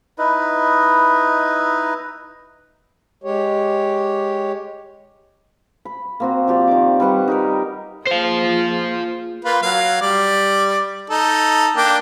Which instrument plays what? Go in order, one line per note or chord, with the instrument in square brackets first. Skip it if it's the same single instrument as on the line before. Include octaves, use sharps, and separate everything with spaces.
[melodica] D#4 E4 B4 D#5
[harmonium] G#3 G4 C#5
[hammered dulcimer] B5
A#3 C4 F#4
F3 G4 D5
D#3 D6
G3 B4 F#5 C#6
D#4 G4 A#4
[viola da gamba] A#3 F4 G#4 [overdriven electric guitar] C5 F5
[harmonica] A#3 F4 B4
F#3 F5
G3 D5
D#4 A4
A#3 D4 G5